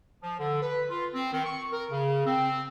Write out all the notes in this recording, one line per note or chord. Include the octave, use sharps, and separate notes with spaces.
F3
D3
B4
F4
C4
D#3
C#6
A#4
C#3
C4